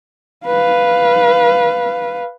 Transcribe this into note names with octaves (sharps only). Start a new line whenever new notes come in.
B4 F5